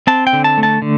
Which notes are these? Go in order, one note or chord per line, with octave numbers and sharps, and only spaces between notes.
C4 A5
G5
D3
A5
A3
A5
D3